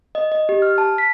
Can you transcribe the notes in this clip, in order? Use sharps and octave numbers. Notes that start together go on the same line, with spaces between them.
D#5
D#5
G4
F6
A5
B6